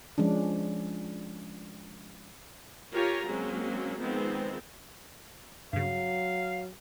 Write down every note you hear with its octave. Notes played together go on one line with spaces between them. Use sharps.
F3 G#3 C#4 D4
F4 G4 A#4 C#5 G#5 A#5
F#3 G#3 A#3 C4 C#4
D#3 F3 G#3 B3 C4
G2 C#3 F#3 F5